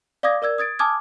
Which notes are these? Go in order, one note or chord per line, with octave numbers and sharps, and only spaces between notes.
D5 F5 D6 D#6 G#6 A#6
A#4 D5 E6 G#6
D#6 G#6 A6 D7
G#5 A5 D6 D#6 F6 G#6